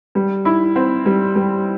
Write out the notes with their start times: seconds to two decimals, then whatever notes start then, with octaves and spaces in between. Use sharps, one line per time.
0.15 G3
0.45 E4
0.76 C4
1.06 G3
1.36 G3